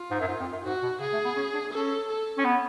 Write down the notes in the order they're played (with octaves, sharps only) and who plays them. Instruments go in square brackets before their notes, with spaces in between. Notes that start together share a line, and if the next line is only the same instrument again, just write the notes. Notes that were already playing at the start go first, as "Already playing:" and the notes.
Already playing: [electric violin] F4
[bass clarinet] G#2
F#2
G#2
F2
F#2
[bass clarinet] G#2 [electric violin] F#4
[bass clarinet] B2
[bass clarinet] C#3 [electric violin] G#4
[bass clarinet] A3
B3
C#4
D4
[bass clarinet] C#4 [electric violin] A4
[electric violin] A4
[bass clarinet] C#4
B3